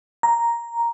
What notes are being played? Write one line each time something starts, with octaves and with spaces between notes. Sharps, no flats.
A#5